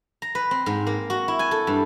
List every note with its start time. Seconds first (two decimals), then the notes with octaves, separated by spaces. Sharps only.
0.22 A#5
0.35 B4
0.51 C4
0.66 G#2
0.87 A#3
1.10 F#4
1.28 E4
1.39 G#5
1.51 A4
1.67 G2